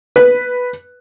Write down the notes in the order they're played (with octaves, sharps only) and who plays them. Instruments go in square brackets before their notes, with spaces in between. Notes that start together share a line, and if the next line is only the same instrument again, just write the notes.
[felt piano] B4